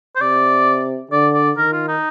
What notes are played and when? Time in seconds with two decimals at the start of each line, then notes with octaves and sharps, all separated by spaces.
0.16 C5
0.21 C3 D5
1.11 D3 D5
1.34 D5
1.57 D#3 A#4
1.73 F4
1.88 D#4